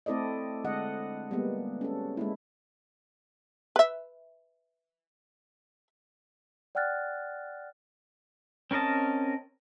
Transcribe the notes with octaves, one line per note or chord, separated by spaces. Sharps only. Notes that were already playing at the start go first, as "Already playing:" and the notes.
A3 C4 E4 A4 D5 D#5
D3 G#3 A4 D#5 F#5
G3 G#3 A#3 B3
C#4 A4
G#3 A#3 E4
B4 E5
D5 F#5 G5 F6 F#6 A6
C4 C#4 A#4 D#5 A5